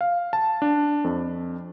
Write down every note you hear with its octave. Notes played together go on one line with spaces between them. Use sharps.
F5
A5
D4
F2